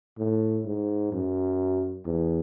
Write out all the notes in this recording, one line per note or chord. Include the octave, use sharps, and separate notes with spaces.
A2
G#2
F#2
E2